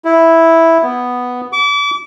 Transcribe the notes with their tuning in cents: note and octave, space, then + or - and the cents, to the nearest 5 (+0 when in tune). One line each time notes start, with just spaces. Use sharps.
E4 -5
B3 +0
D6 -35